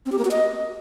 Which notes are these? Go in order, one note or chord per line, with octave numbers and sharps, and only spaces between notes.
C4
G4
A#3
F#4
D#5